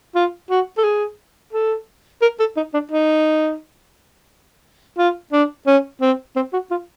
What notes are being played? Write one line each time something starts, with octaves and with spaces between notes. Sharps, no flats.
F4
F#4
A4
G#4
A4
A#4
A4
D#4
D4
D#4
F4
D4
C#4
C4
C4
F#4
F4